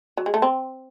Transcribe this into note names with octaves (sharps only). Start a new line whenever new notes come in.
F#3
G#3
A3
C4